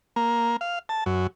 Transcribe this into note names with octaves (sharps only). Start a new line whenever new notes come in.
A#3
F5
A5
F#2